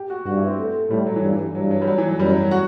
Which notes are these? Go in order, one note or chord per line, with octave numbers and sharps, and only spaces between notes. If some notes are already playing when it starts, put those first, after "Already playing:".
Already playing: G4
F#4
G2 F#4
E4
C4
A3
A3
A2 G3
F#3
E3
G2
E3
G2 F#3
F#3
G3
F#3
E3
F#3
F#2 G3
F#3
F#4